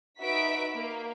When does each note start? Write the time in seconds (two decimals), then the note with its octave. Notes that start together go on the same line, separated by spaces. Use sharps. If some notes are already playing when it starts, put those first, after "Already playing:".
0.22 D#4 F#4 B4 E5 B6 D7
0.75 A#3